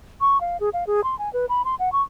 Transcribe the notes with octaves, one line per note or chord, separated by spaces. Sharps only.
C#6
F5
G#4
F5
G#4
C6
G#5
B4
B5
C6
F#5
C#6